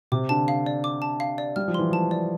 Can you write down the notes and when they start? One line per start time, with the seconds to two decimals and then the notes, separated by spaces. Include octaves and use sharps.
0.12 C3 D6
0.29 D3 A5
0.48 F5
0.66 D5
0.84 D6
1.02 A5
1.20 F5
1.38 D5
1.56 G3 F6
1.68 F3
1.74 E3 C6
1.90 F3 A5
2.11 D5